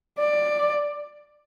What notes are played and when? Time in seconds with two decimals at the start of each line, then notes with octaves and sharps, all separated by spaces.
0.19 D5